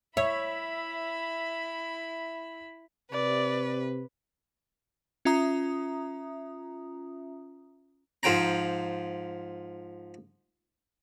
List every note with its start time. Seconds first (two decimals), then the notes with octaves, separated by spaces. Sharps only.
0.17 E4 C#5 E5 B5
3.12 C3 B4 D5
5.25 C#4 F4 E5 A#5 D#6
8.23 G#2 F3 G5 A#5